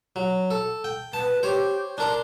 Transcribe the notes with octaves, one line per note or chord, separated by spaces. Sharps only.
F#3
A4
G5
B4 A5
G4 C5 C#5
D4 A#4 A5 C6